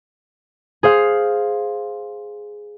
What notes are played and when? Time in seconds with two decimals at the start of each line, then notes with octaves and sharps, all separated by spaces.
0.83 G#4 C5 F5